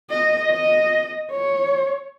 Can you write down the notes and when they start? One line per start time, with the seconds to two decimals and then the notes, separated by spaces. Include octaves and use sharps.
0.11 D#5
0.51 D#5
1.32 C#5